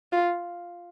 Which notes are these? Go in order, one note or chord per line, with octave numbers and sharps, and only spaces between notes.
F4